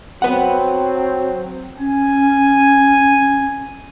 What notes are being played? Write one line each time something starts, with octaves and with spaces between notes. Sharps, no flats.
F#3 C4 B4 F#5
C#4 G#5